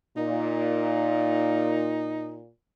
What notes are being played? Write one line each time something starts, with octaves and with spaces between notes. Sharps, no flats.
A#2 D#4